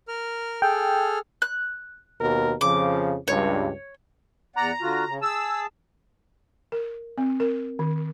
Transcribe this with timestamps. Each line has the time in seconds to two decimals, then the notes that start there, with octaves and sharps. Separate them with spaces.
0.08 A#4 F6
0.62 G#4 A4 G5 F6
1.42 F#6
2.20 D#2 B2 A#4
2.61 F2 C#3 F3 D6
3.28 C#2 G2 C#5
4.56 E2 D5 F#5 A#5
4.81 D3 F4 F#4
5.08 C#3
5.21 G#4 A5 E6
6.72 A#4
7.18 C4
7.40 A#4
7.79 D#3